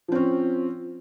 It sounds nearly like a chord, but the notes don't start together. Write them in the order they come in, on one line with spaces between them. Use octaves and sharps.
F3 C4 C#4